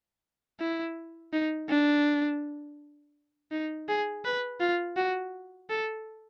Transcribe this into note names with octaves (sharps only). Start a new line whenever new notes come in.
E4
D#4
D4
D#4
G#4
B4
F4
F#4
A4